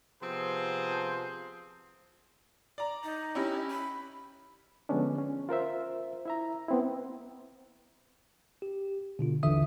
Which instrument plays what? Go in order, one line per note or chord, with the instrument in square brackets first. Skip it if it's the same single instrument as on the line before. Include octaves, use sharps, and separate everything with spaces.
[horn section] C3 F3 B3 C4 G#4 C5
[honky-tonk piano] D5 A#5
[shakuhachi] D#4
[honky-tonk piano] C#4 E4 G4
[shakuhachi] B5
[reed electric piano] D3 F3 G#3 B3 C#4 D4
C#4
F4 A#4 C5 E5
E4 E5 A#5
B3 C4 E4
[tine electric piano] G4
B2 D3 F4
G1 D#2 D3 E3 E5 D#6